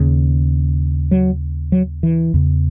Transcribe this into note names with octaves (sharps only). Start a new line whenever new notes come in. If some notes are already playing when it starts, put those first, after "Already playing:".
Already playing: D#2 C#3
F#3
F#3
E3
E2 C#3